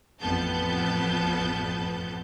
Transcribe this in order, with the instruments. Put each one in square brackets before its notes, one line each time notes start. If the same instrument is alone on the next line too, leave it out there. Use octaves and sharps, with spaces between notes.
[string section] A1 F2 B3 A5 G6